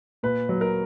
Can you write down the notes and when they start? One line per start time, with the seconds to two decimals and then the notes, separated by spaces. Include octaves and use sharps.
0.23 A#2 B4
0.49 F#3
0.61 A#4